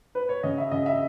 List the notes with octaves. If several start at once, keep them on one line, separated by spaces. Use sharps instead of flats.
B4
C#5
C#3 D#5
E5
C#3 D#5
E5